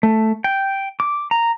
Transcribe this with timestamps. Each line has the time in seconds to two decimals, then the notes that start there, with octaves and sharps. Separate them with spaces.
0.03 A3
0.44 G5
1.00 D6
1.31 A#5